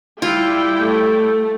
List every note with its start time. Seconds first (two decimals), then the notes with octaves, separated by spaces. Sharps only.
0.22 G3 E4 F4 G5
0.80 A3